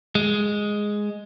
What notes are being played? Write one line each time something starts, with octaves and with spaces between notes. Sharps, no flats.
G#3